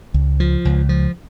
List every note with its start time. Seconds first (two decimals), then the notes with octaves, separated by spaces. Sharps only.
0.14 C#2
0.40 F3
0.65 C#2
0.89 F3